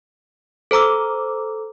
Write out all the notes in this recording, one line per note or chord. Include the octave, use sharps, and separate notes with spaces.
A4 C5 A#5 D6 E6